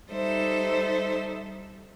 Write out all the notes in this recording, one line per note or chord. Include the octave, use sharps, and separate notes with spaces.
G3 D#4 A4 C5 E5